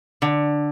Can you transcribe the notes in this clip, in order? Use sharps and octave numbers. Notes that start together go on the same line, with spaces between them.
D3